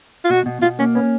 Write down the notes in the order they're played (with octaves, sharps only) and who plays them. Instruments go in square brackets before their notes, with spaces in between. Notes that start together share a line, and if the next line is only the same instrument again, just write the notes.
[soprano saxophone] F4
[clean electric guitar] B2 [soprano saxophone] F#4
[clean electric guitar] B2
[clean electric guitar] B2 [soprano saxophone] F4
[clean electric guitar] A#3 [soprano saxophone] C#4
[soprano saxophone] B3 [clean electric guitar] C#4